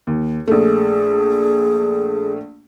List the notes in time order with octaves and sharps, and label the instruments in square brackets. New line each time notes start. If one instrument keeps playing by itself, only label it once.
[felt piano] D#2
[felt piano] A#1 A3 [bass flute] G#4